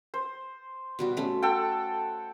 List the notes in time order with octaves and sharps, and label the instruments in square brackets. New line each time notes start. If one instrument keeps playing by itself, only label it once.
[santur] C5
[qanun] B2 G3 F#4
A3 C#4
[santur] A4 F#5 G5